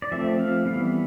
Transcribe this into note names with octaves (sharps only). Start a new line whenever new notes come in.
D5
F3 A3 C4 E5
F5
E3 G3 B3 F5